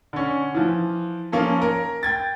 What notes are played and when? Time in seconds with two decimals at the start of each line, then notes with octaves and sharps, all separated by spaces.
0.13 D3 C#4
0.54 E3 F3
1.32 F3 A#3 C#4 A4
1.62 A#4
2.03 G5 G#6 A6